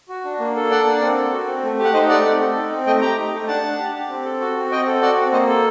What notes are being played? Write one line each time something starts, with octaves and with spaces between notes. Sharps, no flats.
F#4
D4
A#3
A4
D4 D5 F#5
A#3
C4
A4
F#4
C4
A3
G4
F#5
D#4 C5 D#5
A3 D5 F#5
C4
A4
D#4
C4
A3 D#5 G5
G4 G5 A#5
D#4
A3
D4 F#5 A5
D4
G4
G4
C4
A4
F#4
C4
C4 D#5 G5
A4
F#4 D5 F#5
C4
A#3 C5 D#5
A4